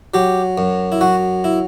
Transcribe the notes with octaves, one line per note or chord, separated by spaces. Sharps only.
F#3 G4
F#2
E4
F#3 F#4
E4